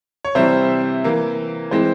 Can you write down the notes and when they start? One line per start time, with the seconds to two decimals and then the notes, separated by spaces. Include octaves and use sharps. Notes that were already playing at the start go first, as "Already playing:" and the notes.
0.25 C#5
0.35 C3 E3 G3 C4 C5 E5
1.04 E3 A#3
1.71 E3 G#3 C4 C5